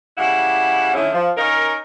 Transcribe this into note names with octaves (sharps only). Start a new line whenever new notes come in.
C#3 G3 E4 F#5
D3 D#3 A3 C#4 E4
F3
C#4 D#4 A#4